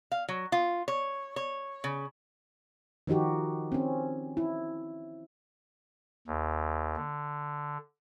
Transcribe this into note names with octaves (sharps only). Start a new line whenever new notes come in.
F5
F#3
F4
C#5
C#5
C#3
D#3 F3 D#4 F#4 G4
C4 C#4
E4
D#2
D3